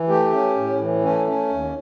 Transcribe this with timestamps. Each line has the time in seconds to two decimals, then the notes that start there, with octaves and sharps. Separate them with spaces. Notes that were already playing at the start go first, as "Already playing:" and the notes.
Already playing: E3
0.08 A3 G4
0.32 C#4
0.56 A2
0.80 E3
1.03 A3 C#4
1.27 C#4
1.50 D#2